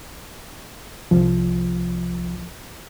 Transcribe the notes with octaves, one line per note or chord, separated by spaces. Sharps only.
C2 F3